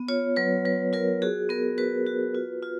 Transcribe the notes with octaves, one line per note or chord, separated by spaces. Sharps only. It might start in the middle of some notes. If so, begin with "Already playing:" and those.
Already playing: B3
F4 C#5
F#3 B4
F#3 B4
F4 A#4
F#4 G#4
B3 A#4
F#4 B4
F#4
F4
F4